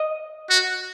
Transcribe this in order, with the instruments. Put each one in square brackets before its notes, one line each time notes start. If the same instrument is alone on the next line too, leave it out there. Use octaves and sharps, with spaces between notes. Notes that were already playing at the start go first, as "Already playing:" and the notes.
Already playing: [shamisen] D#5
[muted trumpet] F#4